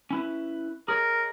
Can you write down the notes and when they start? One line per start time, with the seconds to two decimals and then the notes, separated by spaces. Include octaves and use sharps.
0.11 C#4 E4 B4
0.88 G#4 A#4 C#5 D#5